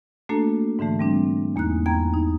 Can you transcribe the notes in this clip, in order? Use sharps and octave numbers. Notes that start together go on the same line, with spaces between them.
A3 A#3 D4 F#4 A4
G#2 D3 E3 A3
G3 C4 D4
E2 A#3 D#4 F#6
E2 B3 G5 A#5 G#6
D#4